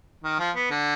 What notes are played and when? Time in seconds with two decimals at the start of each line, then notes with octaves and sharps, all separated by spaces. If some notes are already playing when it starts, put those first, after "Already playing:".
0.24 D#3
0.39 F3
0.56 B3
0.71 D3